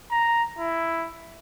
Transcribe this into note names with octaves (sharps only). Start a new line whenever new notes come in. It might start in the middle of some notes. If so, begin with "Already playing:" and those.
A#5
E4